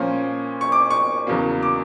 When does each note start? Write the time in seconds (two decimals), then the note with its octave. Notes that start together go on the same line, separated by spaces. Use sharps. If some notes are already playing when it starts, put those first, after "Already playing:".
Already playing: A#2 F3 A#3 C#4
0.61 C#6
0.72 D6
0.90 C#6
1.27 E2 C#3 F#3 A#3
1.63 D6